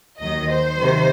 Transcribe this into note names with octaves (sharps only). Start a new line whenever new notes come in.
D#2 D#3 F#3 D#5
C5
C3 D#3 F#3